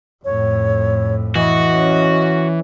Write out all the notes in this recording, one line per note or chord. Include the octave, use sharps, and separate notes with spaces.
F2 A2 C#5
E3 F#4 D#5
C#4